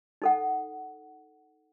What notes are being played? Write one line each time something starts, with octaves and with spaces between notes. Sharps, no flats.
D#4 A4 F#5